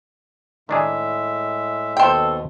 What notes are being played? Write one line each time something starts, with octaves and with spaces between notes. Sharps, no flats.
A2 D#3 G#3 D4 G#4 E5
D#2 B2 A4 C5 G5